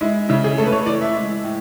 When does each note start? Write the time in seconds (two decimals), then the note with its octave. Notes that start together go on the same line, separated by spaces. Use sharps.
0.01 G#3 E4
0.29 C#3 E4
0.44 G#4
0.58 A3 A4
0.66 B4
0.72 C#5
0.86 E3 D5
1.01 E5
1.15 G#3
1.44 A2